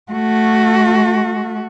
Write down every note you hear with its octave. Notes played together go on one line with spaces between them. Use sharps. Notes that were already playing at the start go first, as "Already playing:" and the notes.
A3 F#4